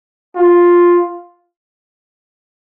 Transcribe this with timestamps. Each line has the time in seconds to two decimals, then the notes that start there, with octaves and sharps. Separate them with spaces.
0.35 F4